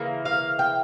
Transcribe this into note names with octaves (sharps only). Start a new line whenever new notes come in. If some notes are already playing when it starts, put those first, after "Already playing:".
Already playing: C#3 E3 A#3
F5
G5